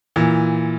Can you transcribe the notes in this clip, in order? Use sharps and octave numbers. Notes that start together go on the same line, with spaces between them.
A#2 E3